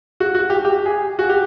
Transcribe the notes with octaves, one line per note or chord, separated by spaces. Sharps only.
F#4
F#4
G4
G4
G#4
F#4
G4